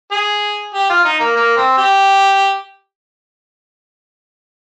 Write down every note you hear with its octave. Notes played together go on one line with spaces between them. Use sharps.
G#4
G4
F4
D#4
A#3
A#3
C4
G4